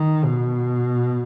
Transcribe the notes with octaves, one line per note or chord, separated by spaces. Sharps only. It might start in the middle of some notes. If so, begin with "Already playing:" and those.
Already playing: D#3
B2